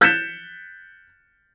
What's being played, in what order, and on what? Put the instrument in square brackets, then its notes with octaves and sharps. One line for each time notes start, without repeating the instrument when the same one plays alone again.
[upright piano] F#6 G6 A6 B6 C#7 E7